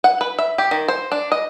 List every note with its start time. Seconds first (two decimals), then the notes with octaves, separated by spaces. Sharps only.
0.04 F#5
0.21 B4
0.39 E5
0.58 G4
0.71 D#3
0.88 C5
1.12 D4
1.32 D#5